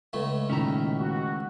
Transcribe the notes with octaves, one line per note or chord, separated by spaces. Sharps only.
C#2 A3 B4
A#2 D#3 C#4 E4 A#5
F#4